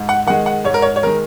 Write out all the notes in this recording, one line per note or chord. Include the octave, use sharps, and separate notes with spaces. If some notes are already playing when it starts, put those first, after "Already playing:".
Already playing: G#2
F#5
D#3 G#3 F#5
F#5
G#2 C#5
A#4
C#5
C#5
D#3 G#3 A#4